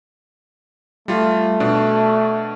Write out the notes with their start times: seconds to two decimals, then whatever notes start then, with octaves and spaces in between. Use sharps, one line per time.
1.08 G3 A3 F4
1.60 B2 D4